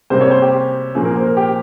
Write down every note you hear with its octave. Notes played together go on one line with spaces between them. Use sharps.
C3 G3 A#3 C5
C#5
C5
G4
A#2 F3 A#3 G#4
A#4
C5
A#4
G4